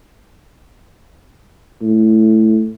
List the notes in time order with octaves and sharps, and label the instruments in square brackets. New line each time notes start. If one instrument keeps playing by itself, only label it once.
[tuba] A2